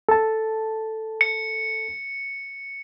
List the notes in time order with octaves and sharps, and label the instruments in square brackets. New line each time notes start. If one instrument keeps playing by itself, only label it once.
[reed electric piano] A4 A5
[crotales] C#7